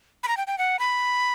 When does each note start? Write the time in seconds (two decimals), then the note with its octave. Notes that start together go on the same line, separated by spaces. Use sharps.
0.23 B5
0.28 A#5
0.37 G5
0.47 G5
0.58 F#5
0.79 B5